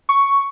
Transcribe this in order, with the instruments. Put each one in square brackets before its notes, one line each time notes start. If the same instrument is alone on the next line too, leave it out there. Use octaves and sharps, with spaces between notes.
[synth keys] C#6